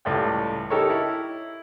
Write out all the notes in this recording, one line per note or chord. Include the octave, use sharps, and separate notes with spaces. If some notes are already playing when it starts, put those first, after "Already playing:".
C#2 A2 G3 G5
D#4 G4 A4 A#4 C#5
E4